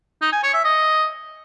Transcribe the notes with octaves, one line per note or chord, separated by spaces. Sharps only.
D#4
G#5
C#5
E5
D#5